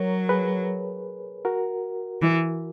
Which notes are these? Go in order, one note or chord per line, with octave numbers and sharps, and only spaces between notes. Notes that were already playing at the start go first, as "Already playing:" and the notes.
Already playing: F#3 A#4 C#5
G#4 B4
F#4 A#4
E3